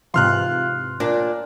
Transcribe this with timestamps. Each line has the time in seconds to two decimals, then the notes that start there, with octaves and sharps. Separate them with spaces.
0.14 G#2 C3 E3 F4 C6 F6 F#6
1.00 A#2 D4